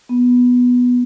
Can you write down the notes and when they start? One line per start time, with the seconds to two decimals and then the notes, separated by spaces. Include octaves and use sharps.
0.09 B3